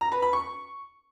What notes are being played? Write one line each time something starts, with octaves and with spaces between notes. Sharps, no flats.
A#5
B4
B5
C#6